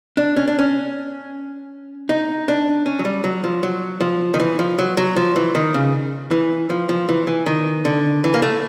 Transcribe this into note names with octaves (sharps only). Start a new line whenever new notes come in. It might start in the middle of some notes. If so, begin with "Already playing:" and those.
D4
C#4
D4
C#4
D#4
D4
C#4
F#3
G3
F#3
F3
F#3
F3
D#3
E3
F3
F#3
F#3
F3
E3
D#3
C#3
E3
F3
F3
E3
E3
D#3
D3
E3
A#3
A3